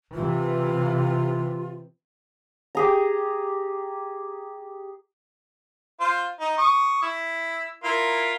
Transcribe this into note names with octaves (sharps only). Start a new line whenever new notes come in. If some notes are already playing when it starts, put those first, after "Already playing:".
C3 E3 F4
G4 G#4 A#5
F4 C5
D#4
C#6 D#6
E4 E6
E4 F4 A#4